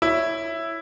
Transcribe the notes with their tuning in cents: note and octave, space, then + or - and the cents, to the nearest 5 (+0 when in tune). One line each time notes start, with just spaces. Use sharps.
E4 +0 C#5 +0